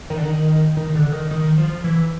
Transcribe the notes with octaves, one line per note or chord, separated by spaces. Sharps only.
D#3
D3
D#3
D#3
D3
D#3
D#3
F3
E3